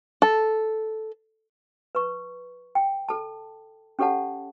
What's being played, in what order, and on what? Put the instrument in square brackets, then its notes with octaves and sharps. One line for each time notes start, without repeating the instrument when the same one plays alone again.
[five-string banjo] A4
[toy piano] B4 C#6
G5
A4 A5
C#4 G4 A4 C#5 F#5 A5